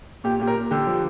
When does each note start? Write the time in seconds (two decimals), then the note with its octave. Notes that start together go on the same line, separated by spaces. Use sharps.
0.24 A#2 G4
0.39 A#2 G4
0.47 A#4
0.55 A#2
0.71 D3 G4
0.87 F3